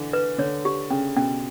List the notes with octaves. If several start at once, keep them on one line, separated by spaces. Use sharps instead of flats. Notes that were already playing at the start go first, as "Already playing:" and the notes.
Already playing: D3 E3
B4
D3 C#5
G4
C#3 C#4
B2 C#4